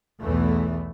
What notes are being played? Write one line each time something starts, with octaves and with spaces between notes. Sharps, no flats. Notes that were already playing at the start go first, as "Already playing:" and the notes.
B1 E2 E3 A3